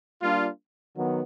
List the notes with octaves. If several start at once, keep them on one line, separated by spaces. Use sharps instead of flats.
G3 A#3 D4 F4
D#3 F#3 B3